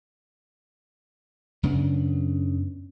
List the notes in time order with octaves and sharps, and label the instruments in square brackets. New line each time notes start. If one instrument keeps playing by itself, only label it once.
[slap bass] F#2 C#3 B3 D4